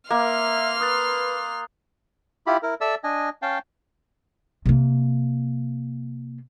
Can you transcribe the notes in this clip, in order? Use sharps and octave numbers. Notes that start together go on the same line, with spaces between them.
A#3 E5 C6 F6
B4 D#6 F#6 A6
E4 F4 G4 B5
E4 A#4
A4 D5 E5 E6
D4 D#5 G#5
C#4 F5 G5 A5
C3 A#3